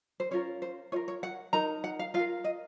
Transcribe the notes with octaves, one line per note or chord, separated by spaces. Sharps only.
C5
C#4 F4 A#4 C#5
C5
F4 A#4 C#5
C#5
F#5
D#4 A#4 A#5
F#5
F5
F4 F5
A#4
D#5